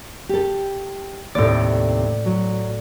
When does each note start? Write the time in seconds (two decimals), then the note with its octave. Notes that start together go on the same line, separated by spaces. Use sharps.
0.29 G4 A4
1.35 D#2 A2 C3 D5
2.26 F#3